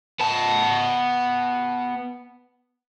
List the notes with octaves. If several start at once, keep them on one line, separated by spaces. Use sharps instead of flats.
B3 A5